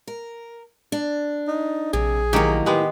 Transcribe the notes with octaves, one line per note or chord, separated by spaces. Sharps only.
A#4
D4
D#4
A#1 C3 G#4
A2 D#3 F#3 A#3 G4
G#3 B3 G4